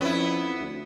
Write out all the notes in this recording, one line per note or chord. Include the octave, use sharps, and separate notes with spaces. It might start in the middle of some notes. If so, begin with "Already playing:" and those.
F2 B3 C#4 E4
D2